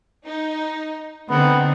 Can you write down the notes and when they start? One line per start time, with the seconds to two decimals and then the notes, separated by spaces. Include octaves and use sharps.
0.25 D#4
1.30 D3 B3 C4 D#4